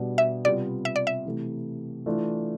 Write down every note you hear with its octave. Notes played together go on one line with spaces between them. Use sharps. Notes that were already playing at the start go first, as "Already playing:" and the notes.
Already playing: B2 G3 D4
E5
C3 G3 B3 F4 D5
E5
D5
E5
C3 E3 A3
E3 A3 D4 F4